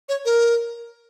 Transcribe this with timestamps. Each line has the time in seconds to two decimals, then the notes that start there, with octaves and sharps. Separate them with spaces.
0.09 C#5
0.25 A#4